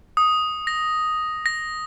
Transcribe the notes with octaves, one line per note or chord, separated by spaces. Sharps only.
D#6
A#6
A#6